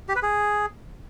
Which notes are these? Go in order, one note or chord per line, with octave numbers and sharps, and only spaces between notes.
G4
B4
G#4